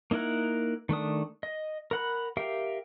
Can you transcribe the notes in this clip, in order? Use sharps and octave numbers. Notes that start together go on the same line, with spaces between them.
A#3 D#4 E4 A#4 F#5
D#3 A3 D4 D#6
D#5
A#4 F#5 B5
G4 A#4 E5 F5 G5